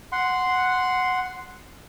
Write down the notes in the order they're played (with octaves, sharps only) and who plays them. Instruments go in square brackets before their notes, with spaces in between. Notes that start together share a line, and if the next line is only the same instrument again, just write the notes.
[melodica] F#5 C6